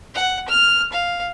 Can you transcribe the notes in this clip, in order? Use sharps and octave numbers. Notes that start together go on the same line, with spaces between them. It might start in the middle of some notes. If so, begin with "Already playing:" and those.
F#5
F6
F5